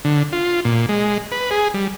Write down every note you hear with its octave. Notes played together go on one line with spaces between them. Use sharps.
D3
F4
A#2
G#3
B4
G#4
G3